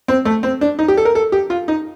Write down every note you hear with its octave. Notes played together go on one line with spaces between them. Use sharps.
C4
A3
C4
D4
D#4
G4
A4
A#4
A4
G4
F4
D#4